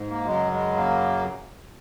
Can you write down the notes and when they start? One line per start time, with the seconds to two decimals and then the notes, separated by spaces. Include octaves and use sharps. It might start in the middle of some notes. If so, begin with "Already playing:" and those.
Already playing: G#2
0.09 A#3
0.26 F#2 C#3 F#3 G#3
0.52 G#3
0.76 A#3